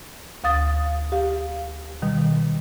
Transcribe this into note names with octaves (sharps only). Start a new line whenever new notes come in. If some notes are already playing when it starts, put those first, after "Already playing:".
D2 F5 D#6 A6
G4 F5
B2 D#3 G3